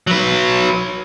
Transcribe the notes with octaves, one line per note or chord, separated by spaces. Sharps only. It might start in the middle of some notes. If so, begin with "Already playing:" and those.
F#3 B4